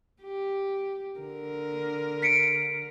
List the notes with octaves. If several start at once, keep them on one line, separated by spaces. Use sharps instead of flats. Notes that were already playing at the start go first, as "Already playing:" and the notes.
G4
D3 A#4
B6 C#7 D7